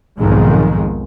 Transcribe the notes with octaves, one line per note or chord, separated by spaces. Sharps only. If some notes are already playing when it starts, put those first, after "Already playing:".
B1 F2 G#2 D#3 G#3